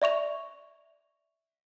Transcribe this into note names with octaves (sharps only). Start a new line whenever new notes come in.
D5 E5 C#6 F7